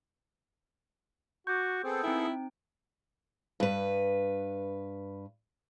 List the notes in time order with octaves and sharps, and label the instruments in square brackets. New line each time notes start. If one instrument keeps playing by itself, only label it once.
[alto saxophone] F#4 [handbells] C#6 D6 [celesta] G6
[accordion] B3 G#4 A4 [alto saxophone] C4
[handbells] C4 D#4 G5 [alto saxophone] E4
[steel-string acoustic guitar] G2 B4